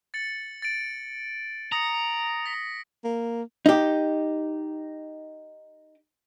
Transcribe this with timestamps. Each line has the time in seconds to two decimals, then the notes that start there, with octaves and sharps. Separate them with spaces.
0.14 A6 C#7 F#7
0.62 A6 D7
1.72 A#5 D#6 C#7
2.46 A#6 B6
3.04 A#3
3.66 D#4 G4